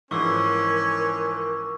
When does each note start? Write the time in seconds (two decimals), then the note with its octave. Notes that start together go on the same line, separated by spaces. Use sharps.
0.11 G#2 E3 F3 C#4 A#4 C#6 D6 E6